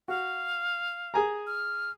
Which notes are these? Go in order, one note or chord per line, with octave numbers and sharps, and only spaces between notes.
F#4 F5
G#4 G#5 A#5
F6